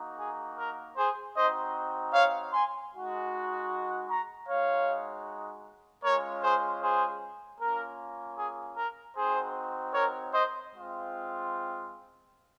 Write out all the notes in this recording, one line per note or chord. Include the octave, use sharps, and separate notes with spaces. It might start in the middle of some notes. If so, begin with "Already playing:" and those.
Already playing: A#3 D#4 F#4
G#4
A#4
G#4 C5
C4 D#4 F#4 C5 D#5
C#5 F5
G#5 C6
G#3 D#4 F#4
A#5 C#6
G#3 D#4 F#4 C#5 F5
G#3 C#4 F4 A#4 C#5
G#4 C5
G#4 C5
A#3 C#4 F4 A#4
G#4
A#4
C4 D#4 F#4 G#4 C5
A#4 C#5
C5 D#5
G#3 C4 F4